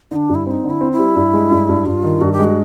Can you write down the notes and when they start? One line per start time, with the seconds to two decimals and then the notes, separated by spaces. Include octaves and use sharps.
0.11 D3 D#4
0.16 D4
0.29 G2
0.35 E4
0.46 C4 D#4 E4
0.64 D3
0.70 E4
0.81 C4
0.92 E4
0.99 G3
1.16 G2
1.34 G#3
1.51 G2
1.69 G2
1.86 G2 F4
2.03 D#3
2.21 G2 F#4
2.32 G4
2.39 G#3 F#4